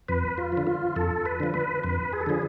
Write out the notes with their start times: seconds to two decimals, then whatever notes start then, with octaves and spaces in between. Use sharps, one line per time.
0.08 F2 B4
0.38 F4
0.52 F3
0.57 D3
0.67 F4
0.96 F2 A4
1.26 B4
1.40 D3 F3
1.54 B4
1.83 F2 B4
2.13 G#4
2.21 A4
2.26 D3 F3 G#4